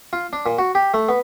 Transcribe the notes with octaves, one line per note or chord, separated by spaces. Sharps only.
F4
D4
A#2
F#4
G4
A3
B3